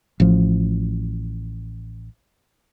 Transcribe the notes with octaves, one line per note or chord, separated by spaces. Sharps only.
A1 F3